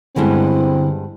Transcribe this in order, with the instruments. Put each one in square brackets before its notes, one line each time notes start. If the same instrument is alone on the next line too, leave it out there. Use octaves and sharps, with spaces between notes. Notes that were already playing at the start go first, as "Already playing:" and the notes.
[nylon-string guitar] G2 G#3 B3 [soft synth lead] D3 [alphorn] C4 [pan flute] E4